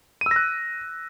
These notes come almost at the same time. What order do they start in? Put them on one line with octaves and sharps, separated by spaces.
D#7 E6 A#6 F#6